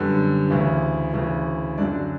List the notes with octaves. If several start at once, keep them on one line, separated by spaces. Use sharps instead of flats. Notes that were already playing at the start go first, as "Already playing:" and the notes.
Already playing: F#2 D3 G3 B3
D2 C#3 E3
D2 C#3 E3
F#2 D3 F#3 D4 D5